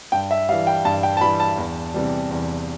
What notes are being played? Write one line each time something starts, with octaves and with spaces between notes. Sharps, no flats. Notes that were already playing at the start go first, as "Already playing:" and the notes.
G2 G5
E5
E3 G3 F5
G5
G2 A5
G5
A5
E3 G3 B5
A5
E2
C3 E3 G3
E2